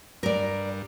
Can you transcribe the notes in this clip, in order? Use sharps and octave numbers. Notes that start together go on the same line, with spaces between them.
G2 A#4 D5